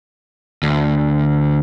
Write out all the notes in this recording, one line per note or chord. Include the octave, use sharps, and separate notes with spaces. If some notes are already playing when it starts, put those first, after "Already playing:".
D2